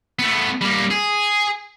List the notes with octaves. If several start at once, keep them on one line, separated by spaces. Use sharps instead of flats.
A3 B3
G3 A#3
G#4